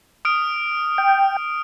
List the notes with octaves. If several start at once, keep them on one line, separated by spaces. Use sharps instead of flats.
D#6 F6 D7
G5